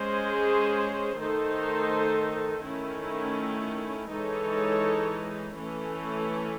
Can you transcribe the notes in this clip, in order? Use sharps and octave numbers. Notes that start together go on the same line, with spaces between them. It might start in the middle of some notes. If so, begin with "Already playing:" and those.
Already playing: G#3 C#4 G#4 C5
D#3 A3 D#4 A4 C5
D#3 A3 C#4 E4
E3 G#3 D#4 A4 C#5
E3 A3 C#4